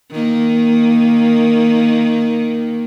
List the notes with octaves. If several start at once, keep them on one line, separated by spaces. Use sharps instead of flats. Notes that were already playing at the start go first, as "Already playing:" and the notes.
D#3 A#3